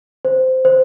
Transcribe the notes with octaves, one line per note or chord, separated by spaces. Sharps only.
C5
C5